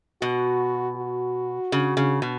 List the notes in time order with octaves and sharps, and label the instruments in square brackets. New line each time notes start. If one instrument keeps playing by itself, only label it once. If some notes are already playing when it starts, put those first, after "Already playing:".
[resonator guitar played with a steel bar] B2 [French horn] F#4
[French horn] F#4
[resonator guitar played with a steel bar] C#3
C#3
B2